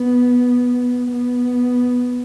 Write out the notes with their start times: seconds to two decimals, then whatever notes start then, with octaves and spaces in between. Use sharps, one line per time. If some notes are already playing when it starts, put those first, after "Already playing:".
Already playing: B3
1.13 B3